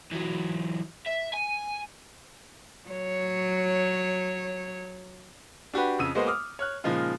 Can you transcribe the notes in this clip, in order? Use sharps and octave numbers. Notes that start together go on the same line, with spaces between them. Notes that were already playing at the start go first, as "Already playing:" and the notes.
E3 F#3
E5
G#5
F#3 C#5
D4 F#4 G4 B4
F2 C#3 E6 D#7
G#3 A#3 B3 F#4 C5 D#5
D6 D#6 F6
C#5 F6 F#6
A#2 C#3 F3 G#3 D#4 F4